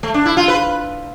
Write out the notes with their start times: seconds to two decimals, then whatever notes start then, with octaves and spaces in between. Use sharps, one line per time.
0.03 A3
0.14 D4
0.26 E4
0.37 F4
0.48 B4